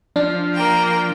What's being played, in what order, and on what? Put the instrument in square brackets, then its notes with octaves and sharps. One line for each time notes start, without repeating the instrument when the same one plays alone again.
[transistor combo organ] F3 [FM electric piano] D4
[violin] A#3 G5